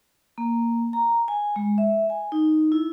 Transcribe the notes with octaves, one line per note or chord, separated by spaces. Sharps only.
A#3
A#5
G#5
G#3
E5
G#5
D#4
E4